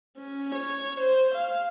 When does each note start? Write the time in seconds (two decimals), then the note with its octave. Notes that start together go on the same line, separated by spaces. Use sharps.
0.17 C#4
0.55 C#5
1.00 C5
1.35 F5